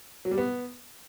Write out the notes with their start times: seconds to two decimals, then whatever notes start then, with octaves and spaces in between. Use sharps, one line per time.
0.25 F#3
0.31 G3
0.38 B3